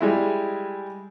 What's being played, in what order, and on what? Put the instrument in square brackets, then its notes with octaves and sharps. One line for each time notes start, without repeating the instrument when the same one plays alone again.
[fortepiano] G3 G#3 E4